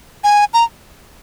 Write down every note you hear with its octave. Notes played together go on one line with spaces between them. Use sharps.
G#5
A#5